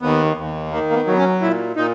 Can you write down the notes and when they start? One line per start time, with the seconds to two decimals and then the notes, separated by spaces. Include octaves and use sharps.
0.02 D#2 B3
0.37 D#2
0.71 D#3 A#3
0.90 A#3
0.95 B3
1.07 F#3 B3
1.18 C#4
1.41 A#2 E4
1.76 A#2 D#4